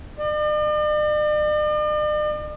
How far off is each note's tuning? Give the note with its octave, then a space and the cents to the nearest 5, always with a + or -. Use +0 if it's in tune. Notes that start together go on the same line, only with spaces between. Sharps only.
D5 +45